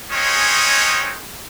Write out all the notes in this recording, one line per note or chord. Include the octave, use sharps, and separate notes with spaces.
G#3 C4 C#4 D#4 G#4 C#5